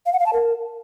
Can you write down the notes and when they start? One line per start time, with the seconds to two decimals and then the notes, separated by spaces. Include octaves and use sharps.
0.06 F5
0.13 F#5
0.20 F5
0.26 A5
0.33 A#4